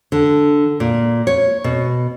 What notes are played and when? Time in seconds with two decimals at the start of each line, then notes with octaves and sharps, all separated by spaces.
0.12 D3
0.80 A#2
1.27 C#5
1.64 B2